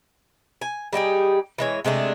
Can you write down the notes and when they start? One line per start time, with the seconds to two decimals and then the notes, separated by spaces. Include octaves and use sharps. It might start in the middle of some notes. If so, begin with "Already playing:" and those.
0.61 G#5
0.93 G3 D#4 G4 G#4
1.58 E3 G#3 C#5
1.85 C3 G#3 A3 D4